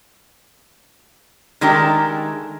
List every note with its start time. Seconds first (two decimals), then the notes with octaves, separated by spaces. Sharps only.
1.61 D#3 G#3 A3 D4 G4 A#4